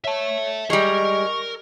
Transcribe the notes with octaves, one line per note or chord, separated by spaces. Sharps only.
C#5 E5 A5
G3 G#3 A#4 D#5 C#6